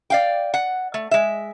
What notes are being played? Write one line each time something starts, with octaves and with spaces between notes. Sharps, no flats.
D5 F5 G5
F#5
A3
G#3 E5